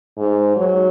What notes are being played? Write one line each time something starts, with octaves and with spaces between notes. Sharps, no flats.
G#2
F#3